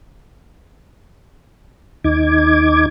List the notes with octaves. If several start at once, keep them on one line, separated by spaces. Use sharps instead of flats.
D#2 D#4 D6 G#6